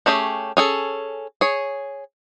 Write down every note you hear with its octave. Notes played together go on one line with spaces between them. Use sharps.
A3 C#4 G4 G#4
C#4 G#4 A4
G#4 C#5